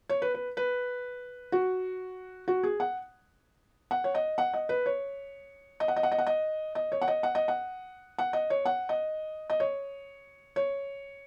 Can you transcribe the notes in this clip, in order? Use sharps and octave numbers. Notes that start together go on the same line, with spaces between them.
C#5
B4
B4
B4
F#4
F#4
G#4
F#5
F#5
C#5
D#5
F#5
D#5
B4
C#5
D#5
F#5
D#5
F#5
D#5
F#5
D#5
D#5
C#5
F#5
D#5
F#5
D#5
F#5
F#5
D#5
C#5
F#5
D#5
D#5
C#5
C#5